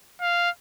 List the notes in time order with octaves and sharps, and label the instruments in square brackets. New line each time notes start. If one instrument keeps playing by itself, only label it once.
[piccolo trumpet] F5